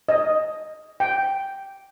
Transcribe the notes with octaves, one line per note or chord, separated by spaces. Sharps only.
D#5
G5